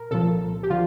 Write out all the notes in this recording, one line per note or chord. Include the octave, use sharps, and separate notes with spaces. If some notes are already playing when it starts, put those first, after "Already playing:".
Already playing: A#2 A#4
C2 A#2 F3 A4
G4
D3 F3 F4